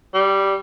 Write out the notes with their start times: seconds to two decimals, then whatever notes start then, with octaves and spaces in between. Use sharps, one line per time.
0.14 G3